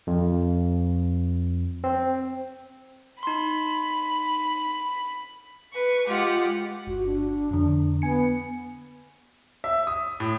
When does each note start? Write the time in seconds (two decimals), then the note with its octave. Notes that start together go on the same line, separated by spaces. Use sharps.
0.07 F2
1.84 C4
3.23 D#4 B5 C6
5.72 B4 C#6
6.07 G#3 F4 G4 F#5
6.87 G1 F#4
7.06 D4
7.51 F2 D3
8.02 B3 G#5 C#7
9.64 E5
9.87 D#6
10.20 A2